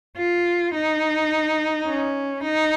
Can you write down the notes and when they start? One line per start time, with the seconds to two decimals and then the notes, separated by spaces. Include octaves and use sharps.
0.17 F4
0.74 D#4
1.87 C#4
2.44 D#4